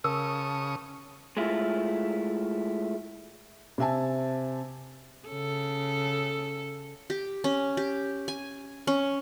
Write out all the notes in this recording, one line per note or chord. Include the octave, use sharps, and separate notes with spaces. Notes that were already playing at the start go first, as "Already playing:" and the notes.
C#3 A#4 A5 C#6 D#6 E6
G#3 A3 E4 F4
C3 C4 E5 G#5 A5
C#3 A4
G4
C#4
G4
G#5
C#4